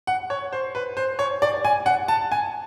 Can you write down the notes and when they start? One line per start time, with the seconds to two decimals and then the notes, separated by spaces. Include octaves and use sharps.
0.07 F#5
0.30 C#5
0.53 C5
0.75 B4
0.97 C5
1.19 C#5
1.42 D5
1.65 G#5
1.86 F#5
2.08 A5
2.32 G#5